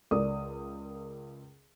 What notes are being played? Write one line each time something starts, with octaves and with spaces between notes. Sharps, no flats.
C#2 A#4 D5 D#6